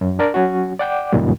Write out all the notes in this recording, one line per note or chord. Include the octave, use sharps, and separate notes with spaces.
F#2
D4 A#4 D5
F#3 C#4 F#4
D5 F#5 G5 D6
C#2 F#2 A#2 D#3 G3